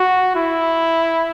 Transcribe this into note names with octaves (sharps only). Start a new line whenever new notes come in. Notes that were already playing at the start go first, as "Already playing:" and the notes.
Already playing: F#4
E4